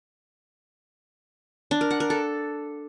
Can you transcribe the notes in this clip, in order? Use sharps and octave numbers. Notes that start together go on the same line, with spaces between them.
D4
A#4
F#5
A#4
A4